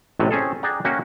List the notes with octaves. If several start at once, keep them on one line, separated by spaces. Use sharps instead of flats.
A1 A2 C3 F#3 G3
C4 C#4 G#4 A4
G#4 D5 F#5 G5 A#5
A#3 C#4 F#4 E5 F#5 G5